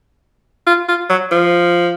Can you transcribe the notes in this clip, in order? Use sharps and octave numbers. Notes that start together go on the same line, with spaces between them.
F4
F4
F#3
F3